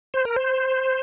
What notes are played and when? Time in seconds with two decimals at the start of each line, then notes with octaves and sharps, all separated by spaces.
0.14 C5
0.25 A#4
0.36 C5